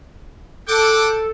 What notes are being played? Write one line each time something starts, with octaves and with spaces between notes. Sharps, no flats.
A4 F#5 G5 D6